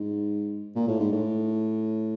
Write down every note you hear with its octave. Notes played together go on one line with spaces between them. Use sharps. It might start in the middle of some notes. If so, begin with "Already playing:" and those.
Already playing: G#2
A#2
A2
G#2
A2